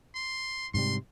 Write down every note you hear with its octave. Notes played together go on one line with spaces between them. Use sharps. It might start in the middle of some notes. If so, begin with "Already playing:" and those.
C6
G#2 C3 G3 C6